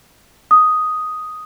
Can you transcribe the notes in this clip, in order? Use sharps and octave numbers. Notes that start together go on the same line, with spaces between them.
D#6